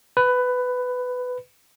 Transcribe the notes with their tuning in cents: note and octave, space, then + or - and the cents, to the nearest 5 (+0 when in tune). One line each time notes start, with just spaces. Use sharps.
B4 +15